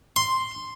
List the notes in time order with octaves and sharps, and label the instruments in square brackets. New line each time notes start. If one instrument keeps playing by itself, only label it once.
[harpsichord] C6